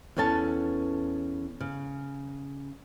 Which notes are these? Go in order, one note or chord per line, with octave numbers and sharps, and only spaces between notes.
E2 B3 C#4 A4 A5
C#3